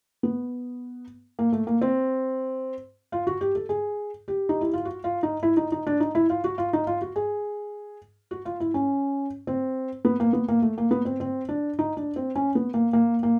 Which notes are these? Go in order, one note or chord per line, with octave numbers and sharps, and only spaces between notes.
B3
A#3
A3
A#3
C4
F4
F#4
G4
A4
G#4
G4
D#4
E4
F4
F#4
F4
D#4
E4
D#4
D#4
D4
D#4
E4
F4
F#4
F4
D#4
F4
F#4
G#4
F#4
F4
E4
C#4
C4
B3
A#3
B3
A#3
A3
A#3
B3
C4
C4
D4
D#4
D4
C4
C#4
B3
A#3
A#3
A#3